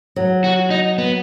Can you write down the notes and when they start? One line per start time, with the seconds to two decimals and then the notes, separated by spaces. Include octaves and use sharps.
0.16 F#3
0.44 F#4
0.70 D#4
0.98 B3